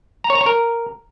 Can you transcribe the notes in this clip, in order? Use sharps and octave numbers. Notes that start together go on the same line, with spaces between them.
A#5
C#5
A#5
C#5
A#4